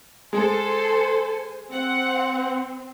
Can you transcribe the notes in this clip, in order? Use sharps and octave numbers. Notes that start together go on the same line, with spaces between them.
G#3 A4 C5 G#5 C6
C4 C5 F#5